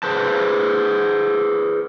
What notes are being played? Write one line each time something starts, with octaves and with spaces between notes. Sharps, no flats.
G#4 B4 C5 A5